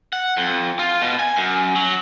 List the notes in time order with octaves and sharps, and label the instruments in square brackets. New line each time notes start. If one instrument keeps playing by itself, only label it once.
[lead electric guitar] F#5
F2
F4
B2
G#5
F#2
F#3